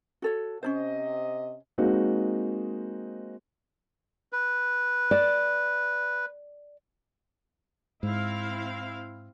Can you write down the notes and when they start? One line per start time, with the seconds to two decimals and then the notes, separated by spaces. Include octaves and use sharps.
0.22 F#4 A4 C#5
0.63 C3 C#4 D4 C5 D#5
1.78 G#3 A#3 C4 D#4 F#4
4.33 B4
5.11 D5
8.03 G#2 C4 E4 F5